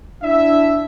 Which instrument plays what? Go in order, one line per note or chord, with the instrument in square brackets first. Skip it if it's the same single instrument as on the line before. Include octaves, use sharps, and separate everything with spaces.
[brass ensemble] D4 E4 E5